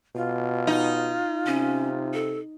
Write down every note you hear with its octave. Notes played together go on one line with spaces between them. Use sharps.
B2 F4
D#4
C3 C#4
A4